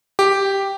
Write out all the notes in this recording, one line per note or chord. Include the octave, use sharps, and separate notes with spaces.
G4